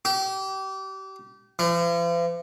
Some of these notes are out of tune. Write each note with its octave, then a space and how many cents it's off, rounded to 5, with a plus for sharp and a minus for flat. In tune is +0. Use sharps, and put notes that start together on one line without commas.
G4 -30
F3 -45